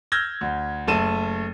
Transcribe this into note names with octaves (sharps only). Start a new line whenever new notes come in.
E6 F6 G6 G#6 A#6 G7
D2
F#1 A3 A5 D#7 E7